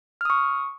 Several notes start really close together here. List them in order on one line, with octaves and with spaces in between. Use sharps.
F6 D#6 C#6